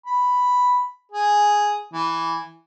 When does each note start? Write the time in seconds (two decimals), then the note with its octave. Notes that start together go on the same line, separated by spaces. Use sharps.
0.06 B5
1.12 G#4
1.93 E3